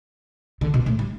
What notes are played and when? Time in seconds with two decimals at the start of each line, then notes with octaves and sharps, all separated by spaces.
0.61 D3
0.74 B2
0.86 A2
0.99 G3